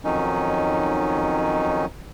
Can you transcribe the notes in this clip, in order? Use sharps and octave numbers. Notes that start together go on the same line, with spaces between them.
F2 D#3 F#3 C#4 D#4